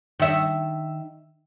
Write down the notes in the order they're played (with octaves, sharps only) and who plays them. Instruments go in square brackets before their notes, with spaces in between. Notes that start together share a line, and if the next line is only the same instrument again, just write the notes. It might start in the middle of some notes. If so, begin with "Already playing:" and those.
[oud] D#3 E5